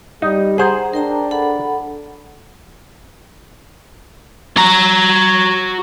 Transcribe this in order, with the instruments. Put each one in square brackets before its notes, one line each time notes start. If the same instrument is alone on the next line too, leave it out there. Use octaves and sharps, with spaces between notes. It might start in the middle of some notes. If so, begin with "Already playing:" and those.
[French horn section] G3 [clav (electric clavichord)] D#4
[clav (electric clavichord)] G#4 C5 [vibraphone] F#5 A#5
[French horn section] D4 [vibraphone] A#4 G5 A#5
[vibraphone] A4 F#5 B5
[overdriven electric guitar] F#4 A#5